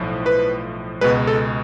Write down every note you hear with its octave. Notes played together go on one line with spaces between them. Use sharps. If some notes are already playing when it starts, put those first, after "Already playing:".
Already playing: B1 A2 F3
B4
C#2 B2 G#3 B4
A4